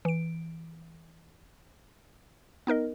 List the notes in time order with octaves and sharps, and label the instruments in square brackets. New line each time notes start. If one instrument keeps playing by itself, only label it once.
[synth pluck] E3 D7
B3 D#4 A#4 D#5